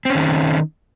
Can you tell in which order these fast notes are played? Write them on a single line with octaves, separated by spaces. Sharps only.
C4 C#4 D#3